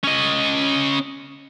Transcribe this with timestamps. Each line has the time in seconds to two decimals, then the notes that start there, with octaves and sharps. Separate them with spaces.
0.03 C#4 D#5